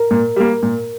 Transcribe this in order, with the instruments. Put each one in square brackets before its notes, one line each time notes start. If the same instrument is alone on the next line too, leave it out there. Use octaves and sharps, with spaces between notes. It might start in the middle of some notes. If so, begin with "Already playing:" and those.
Already playing: [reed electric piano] A#4
[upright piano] A#2
G3 A#3
A#2